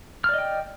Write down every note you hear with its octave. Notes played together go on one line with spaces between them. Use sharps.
D5 D#5 G5 F6